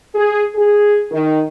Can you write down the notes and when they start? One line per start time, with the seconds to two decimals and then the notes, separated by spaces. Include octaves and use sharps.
0.15 G#4
0.56 G#4
1.12 D#3